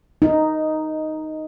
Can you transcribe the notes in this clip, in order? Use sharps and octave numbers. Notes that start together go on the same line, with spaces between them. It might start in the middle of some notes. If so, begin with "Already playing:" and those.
D#4